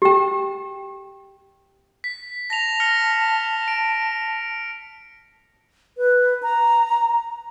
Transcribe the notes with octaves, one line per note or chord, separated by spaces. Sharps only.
G4 G5
B6
A5 A#6 F7
F6 A#6 C#7
D7
B4
A#5